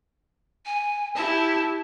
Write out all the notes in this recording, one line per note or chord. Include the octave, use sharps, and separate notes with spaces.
G#5
E4 G4 A5